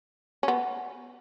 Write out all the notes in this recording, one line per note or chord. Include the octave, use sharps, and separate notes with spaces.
C#4
B3